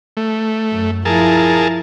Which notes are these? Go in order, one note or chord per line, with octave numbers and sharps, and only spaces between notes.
A3
F#2
F3 E4 G#4 A#4 A5